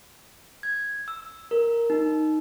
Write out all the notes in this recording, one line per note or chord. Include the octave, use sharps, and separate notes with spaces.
G#6
E6
A#4
D#4